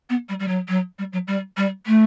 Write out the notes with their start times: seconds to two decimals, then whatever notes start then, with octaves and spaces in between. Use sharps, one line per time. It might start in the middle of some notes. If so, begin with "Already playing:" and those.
0.10 B3
0.29 G3
0.40 G3
0.48 F#3
0.68 F#3
0.99 G3
1.13 F#3
1.28 G3
1.57 G3
1.87 A3